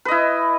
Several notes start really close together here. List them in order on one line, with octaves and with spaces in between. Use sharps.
B4 D#5 E4